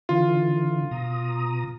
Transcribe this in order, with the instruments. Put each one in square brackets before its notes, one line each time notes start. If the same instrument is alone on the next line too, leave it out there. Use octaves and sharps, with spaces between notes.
[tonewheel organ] D3 E3 [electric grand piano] F4
[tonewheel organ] B2 A#5 D#6